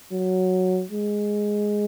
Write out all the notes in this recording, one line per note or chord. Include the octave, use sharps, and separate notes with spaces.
F#3
G#3